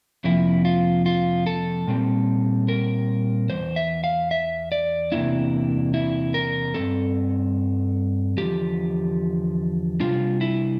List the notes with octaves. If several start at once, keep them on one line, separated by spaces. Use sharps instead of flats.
F2 C3 F3 A#3 E4
F4
F4
A4
A#2 G3 C4
A#4
E2 E3 C5
E5
F5
E5
D5
E2 C3 E3 A#3 D4 E4
E4
A#4
G2 F3 C4 A4
E2 D3 F3 G4
C3 G3 D4 F4
E4